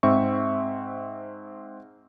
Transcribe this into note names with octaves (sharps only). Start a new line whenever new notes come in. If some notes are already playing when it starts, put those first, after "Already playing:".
G#2 C4 E5 C#6